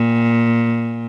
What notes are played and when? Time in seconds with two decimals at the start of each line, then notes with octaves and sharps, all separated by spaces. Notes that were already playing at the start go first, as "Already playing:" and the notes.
Already playing: A#2